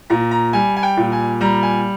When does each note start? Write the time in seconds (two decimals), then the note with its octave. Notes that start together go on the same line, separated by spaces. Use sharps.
0.10 A#2 A#5
0.31 A#5
0.53 G3 G#5
0.77 G#5
0.83 G5
0.97 A#2
1.12 G#5
1.41 G3 A#5
1.63 G#5